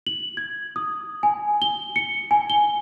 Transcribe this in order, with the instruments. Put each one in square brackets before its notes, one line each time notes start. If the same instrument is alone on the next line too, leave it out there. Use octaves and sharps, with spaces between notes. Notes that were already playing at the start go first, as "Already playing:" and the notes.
[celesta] F#7
G#6
D#6
G#5
G7
C#7
G#5
G7